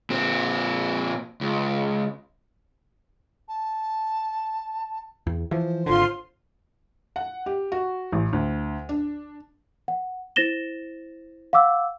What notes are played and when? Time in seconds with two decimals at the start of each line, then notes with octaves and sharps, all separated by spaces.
0.10 A#2 C4
1.41 C#2
3.48 A5
5.27 E2
5.51 E3 F3 C5
5.86 G#1 D3 F4 C6
7.16 F#5
7.46 G4
7.72 F#4
8.12 A1
8.33 D2
8.89 D4
9.88 F#5
10.36 E4 C5 A6 A#6 E7 G7
11.53 F5 F#5 D6 E6